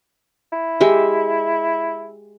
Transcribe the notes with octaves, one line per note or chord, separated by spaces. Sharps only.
E4
G#3 G4 E5